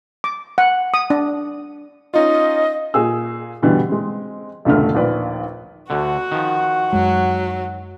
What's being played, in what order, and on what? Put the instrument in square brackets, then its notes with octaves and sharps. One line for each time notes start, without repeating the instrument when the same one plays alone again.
[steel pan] D6
F#5
D#6
D4
[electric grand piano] C#4 D#4 F4 [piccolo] D#5
[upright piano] A#2 G#4 E6
G2 B2 D3 E3 G3
G#3 C4
E1 C#2 G2 D3 A3 F6
A#1 D#2 B4 D5
[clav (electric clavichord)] D2 D3 [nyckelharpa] F#4 F#5
[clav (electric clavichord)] D#3 F3
[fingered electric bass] F#2 G#3 [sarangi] F#3